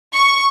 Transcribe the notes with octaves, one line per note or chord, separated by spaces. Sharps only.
C#6